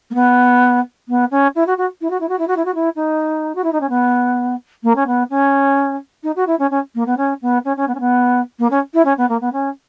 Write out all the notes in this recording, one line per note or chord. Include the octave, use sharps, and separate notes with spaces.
A#3
B3
B3
C#4
E4
F#4
F#4
E4
F#4
E4
F#4
E4
F#4
E4
F#4
E4
D#4
F#4
E4
D#4
C#4
B3
A#3
C#4
B3
C#4
D#4
F#4
E4
C#4
C#4
A#3
B3
C#4
B3
C#4
C#4
B3
C#4
B3
A#3
C#4
E4
C#4
B3
A#3
B3
C#4